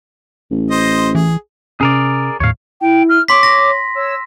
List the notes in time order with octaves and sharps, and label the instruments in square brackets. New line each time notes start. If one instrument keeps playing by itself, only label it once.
[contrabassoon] A1
[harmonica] C5 D#5
[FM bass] E3 [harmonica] G#4
[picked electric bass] C3 C#4 [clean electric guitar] G#4 A#4 D5
[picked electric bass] D#2 A2 [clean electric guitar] C#5 F5
[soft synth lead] E4 [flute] G5
[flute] F6
[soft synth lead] C#5 [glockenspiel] C6 B6 [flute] D6
[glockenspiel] A#6
[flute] C#5 [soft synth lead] E6